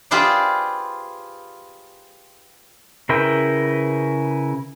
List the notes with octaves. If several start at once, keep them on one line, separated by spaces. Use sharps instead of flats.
F4 G4 G#4 B4 C5 D5
C#3 E4 A#4 B4 G5